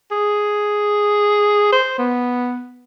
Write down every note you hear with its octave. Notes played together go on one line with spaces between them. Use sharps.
G#4
C5
B3